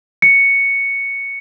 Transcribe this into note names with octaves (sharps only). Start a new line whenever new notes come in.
C#7